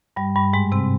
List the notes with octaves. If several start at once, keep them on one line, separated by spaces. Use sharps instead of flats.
G2 G3
G2 G3
G#2 G#3
C3 C4